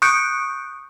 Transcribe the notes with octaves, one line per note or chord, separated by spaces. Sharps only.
C#6 D#6 F#6 G6 C#7 D7